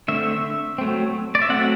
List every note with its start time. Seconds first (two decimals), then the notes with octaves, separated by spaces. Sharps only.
0.08 D3 A3 C4 E5
0.78 F#3 A3 C4
1.35 D5
1.42 E5
1.50 F#3 A3 C4 F#5